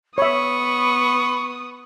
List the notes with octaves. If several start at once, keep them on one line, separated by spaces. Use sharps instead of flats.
B3 C#5 E5 B5 C#6 D#6